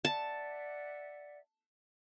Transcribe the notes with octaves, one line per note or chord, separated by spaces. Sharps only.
D5 E5 F#5 A5